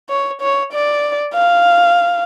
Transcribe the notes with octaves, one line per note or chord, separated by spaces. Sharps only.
C#5
C#5
D5
F5